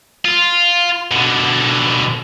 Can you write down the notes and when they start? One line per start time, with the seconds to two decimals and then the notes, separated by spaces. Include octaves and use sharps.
0.25 F4
1.11 B2 D3